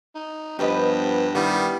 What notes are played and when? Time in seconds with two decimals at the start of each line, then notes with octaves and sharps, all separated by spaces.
0.15 D#4
0.59 G2 F3 B3 G4 B4 C5 D#5
1.35 D#3 G3 B3 E4